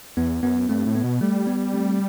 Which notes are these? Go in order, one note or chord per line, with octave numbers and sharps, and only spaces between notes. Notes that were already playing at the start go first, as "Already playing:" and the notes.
E2 B3
F#2 B3
G2 A3 C4
A2
B3
B2
G3 A3
B3
A3 C4